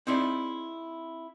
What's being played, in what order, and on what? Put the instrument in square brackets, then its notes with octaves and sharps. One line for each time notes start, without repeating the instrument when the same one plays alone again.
[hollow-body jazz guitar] C4 D#4 E4 G#4 D5